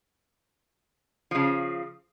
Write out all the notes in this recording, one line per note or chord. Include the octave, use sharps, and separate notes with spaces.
C#3 F3